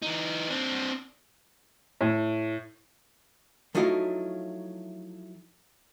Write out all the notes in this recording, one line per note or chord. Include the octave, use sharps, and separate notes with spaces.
E3 D#4
C4 D4
A2
F3 F#3 A3 D#4 E4 F5